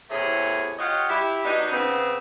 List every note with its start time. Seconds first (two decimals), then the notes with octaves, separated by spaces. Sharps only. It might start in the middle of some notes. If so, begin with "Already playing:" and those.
0.10 E2 A2 C3 A3 G#4 C#5
0.79 F4 G4 C#5 D#5 F#5
1.09 E4 G4
1.45 F#3 B3 D4 D#4
1.72 C#3 B3 C4